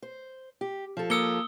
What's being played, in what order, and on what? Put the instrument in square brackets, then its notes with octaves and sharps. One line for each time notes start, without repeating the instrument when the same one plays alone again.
[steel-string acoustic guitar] C5
G4
F3 A4
[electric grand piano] A#3 C#7 [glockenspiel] D#6 E6 G7